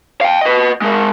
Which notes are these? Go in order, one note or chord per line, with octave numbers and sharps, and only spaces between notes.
F5 G5
B4 D#5
G#3 A#4